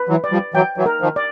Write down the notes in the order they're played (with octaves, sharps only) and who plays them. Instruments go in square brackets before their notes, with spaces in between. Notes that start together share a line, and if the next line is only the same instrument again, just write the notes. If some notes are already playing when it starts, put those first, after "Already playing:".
Already playing: [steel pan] B4
[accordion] E3 F#3
[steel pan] D5
[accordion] F3 G3
[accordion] E3 F#3 [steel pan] G5
[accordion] E3 F#3
[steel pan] A#4
[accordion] D#3 F3
[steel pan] D5